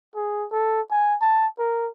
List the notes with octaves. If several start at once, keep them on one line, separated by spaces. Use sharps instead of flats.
G#4
A4
G#5
A5
A#4